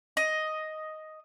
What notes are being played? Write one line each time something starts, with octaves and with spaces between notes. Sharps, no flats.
D#5